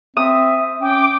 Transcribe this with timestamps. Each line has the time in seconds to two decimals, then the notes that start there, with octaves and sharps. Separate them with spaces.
0.17 C4 E5 D#6
0.81 C#4 G5 D6